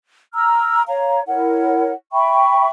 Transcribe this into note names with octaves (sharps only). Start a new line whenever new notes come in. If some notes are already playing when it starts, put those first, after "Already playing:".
A#5 E6 F6
C#5 F5 A#5
E4 A#4 C#5 F#5
E5 G5 B5 C#6